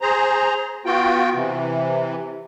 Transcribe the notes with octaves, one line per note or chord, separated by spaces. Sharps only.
G#4 C5 A#5
B3 F4 F#4 G5
C3 E3